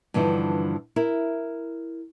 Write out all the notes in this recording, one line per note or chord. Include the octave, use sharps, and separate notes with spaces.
G2 D3 E3 F3 D#4
E4 A#4